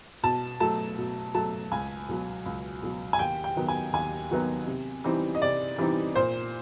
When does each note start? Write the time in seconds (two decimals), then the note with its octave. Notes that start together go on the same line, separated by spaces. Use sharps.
0.23 B2 A5
0.60 F#3 A3 A5
0.98 B2
1.34 F#3 A3 A5
1.72 C#2 G#5
2.08 B2 F#3
2.46 C#2
2.82 B2 F#3
3.13 G#5
3.19 D#2 G5
3.44 G5
3.57 D#3 F#3 B3 D#4
3.68 G#5
3.93 D#2 G#5
4.30 D#3 F#3 B3 D#4
4.67 C3
5.04 E3 G3 C4 D#4
5.35 D#5
5.41 C3 D5
5.78 E3 G3 C4 D#4
6.15 A#2 C5